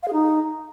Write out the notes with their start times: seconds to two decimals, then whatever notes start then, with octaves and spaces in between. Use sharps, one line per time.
0.03 F5
0.08 G#4
0.13 D#4